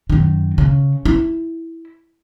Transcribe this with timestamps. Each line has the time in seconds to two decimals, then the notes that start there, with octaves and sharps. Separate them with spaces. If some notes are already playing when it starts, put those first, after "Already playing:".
0.10 F#2 D#3
0.58 C#3
1.05 E4